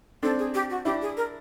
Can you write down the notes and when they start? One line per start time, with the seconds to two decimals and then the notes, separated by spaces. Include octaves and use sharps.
0.23 C4 D4 A4
0.39 G#4
0.54 G4
0.70 F#4
0.85 D4 E4 G4
1.02 G#4
1.17 A#4